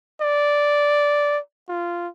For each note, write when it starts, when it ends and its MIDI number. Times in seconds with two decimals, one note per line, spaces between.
0.21 1.39 74
1.69 2.08 65